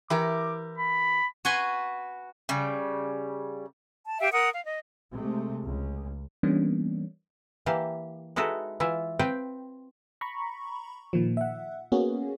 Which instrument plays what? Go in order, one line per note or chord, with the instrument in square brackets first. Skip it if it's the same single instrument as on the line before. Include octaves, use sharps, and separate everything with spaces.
[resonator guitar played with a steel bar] E3 G4 A#4 [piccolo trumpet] D6
[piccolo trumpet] B5
[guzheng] F#4 B4 G#5 C6
[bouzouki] C#3 G3
[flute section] A5
G4 E5 F5 G5
A#4 F#5 D#6
F5
D#5
[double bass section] C3 G#3 A3
C#2
[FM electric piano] E3 G3 A#3 B3 C#4 D4
[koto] E3 A#3 G4 F5 A5
G#3 D#4 E4 F#4 A4 B4
E3 E4 F4 E5
C4 B4 F5 G5
[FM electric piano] A#5 B5 C#6
A#2 D#3 F3
E5 F#5
A#3 B3 C#4 F#4 G#4